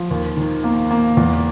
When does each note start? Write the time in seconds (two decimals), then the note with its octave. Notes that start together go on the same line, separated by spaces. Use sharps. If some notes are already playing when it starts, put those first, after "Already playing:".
Already playing: F3
0.11 D#2
0.37 D#3
0.64 A#3
0.91 A#3
1.17 E2